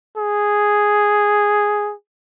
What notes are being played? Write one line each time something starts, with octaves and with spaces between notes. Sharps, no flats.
G#4